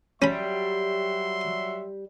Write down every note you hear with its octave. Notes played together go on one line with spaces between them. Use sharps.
F#3 G3 C#4 E5 B5 C6